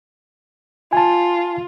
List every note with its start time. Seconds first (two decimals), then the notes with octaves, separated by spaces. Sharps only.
0.93 F4 G#5 A5